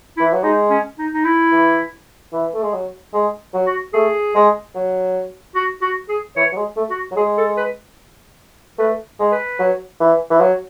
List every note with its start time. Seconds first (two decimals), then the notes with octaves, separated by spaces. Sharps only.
0.17 E4
0.20 E3
0.33 F#3
0.43 G#3 D#4
0.70 C#4
0.98 D#4
1.14 D#4
1.25 E4
1.52 E3
2.33 E3
2.54 A3
2.63 G#3
2.73 F#3
3.13 G#3
3.54 F#3
3.66 F#4
3.93 A3 G#4
4.35 G#3
4.75 F#3
5.55 F#4
5.82 F#4
6.09 G#4
6.36 E3 C#5
6.52 F#3
6.57 G#3
6.76 A3
6.90 F#4
7.11 F#3
7.16 G#3 G#4
7.38 A4
7.57 B4
8.78 A3 B4
9.19 G#3
9.32 B4
9.59 F#3
10.00 E3
10.30 E3
10.40 F#3